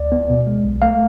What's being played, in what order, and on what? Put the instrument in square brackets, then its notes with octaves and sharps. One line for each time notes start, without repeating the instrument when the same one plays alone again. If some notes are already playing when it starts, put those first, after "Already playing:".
Already playing: [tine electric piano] D2 D5
B3
B2
G#3
B1
A3 F5